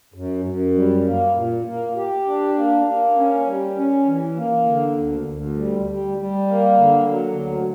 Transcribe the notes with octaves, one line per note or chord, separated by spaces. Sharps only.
F#2
F#2
G3
A#3
A#2
A#3
G4
D4
A#3
A#3
C#4
G3
C#4
E3
A#3
D3
D2
D2
G3
G3
G3
A#3
D3
F#3
D2